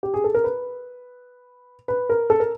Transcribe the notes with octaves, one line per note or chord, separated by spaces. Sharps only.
G4
G#4
A4
A#4
B4
B4
A#4
A4
A#4